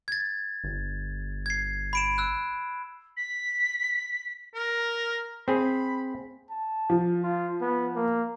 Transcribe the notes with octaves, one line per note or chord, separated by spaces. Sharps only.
G#6 A6
G1
G#6 C7
B5 D7 E7
E6 F#6
B6
A#4
C4 G#4 B5
A5
F3
F4
B3
A#3